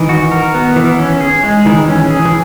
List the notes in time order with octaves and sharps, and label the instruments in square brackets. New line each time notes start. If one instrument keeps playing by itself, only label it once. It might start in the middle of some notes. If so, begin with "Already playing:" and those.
Already playing: [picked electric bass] D#3 [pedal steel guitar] E3
[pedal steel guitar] F#4
A#4
B3
E3
C#4
G#4
G#3
[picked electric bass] D#3 [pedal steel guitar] E3
[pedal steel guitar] C#4
[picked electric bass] E3
[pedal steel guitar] G#4
[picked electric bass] E3